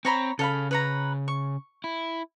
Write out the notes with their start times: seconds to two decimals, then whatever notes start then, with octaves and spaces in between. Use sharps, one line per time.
0.05 C4 C#5 A#5 B5
0.39 C#3 A4 F5 B5
0.71 B4 C#5 A#5
1.28 C#6
1.84 E4